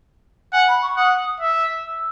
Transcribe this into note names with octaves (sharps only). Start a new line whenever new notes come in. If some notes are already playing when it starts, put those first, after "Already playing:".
F#5 G#5
B5
C#6
F#5 D#6
E5
E6